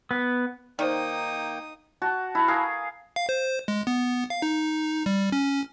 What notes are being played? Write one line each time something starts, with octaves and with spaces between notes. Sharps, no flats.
B3
D#3 A#3 D#4 C5 D5 G5 D#6
F#4 A5
E4 A4
G#4 A#4 F5
F5
C5
G#3
B3
F5
D#4
G3
C#4